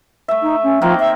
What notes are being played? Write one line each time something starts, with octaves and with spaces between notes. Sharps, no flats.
A3 E5
D#4
C#4
D#3 F3 A#3 C4
E5